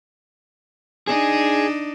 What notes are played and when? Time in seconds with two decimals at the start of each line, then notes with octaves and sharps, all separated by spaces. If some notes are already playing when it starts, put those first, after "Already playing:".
1.07 D4 D#4 G#4